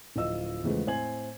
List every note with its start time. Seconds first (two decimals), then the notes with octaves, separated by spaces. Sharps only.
0.16 D1 F3 F4 D#5 E6
0.64 E2 C#3 F3 G#3 A3 B3
0.87 A2 C4 C5 G#5 G#6 F#7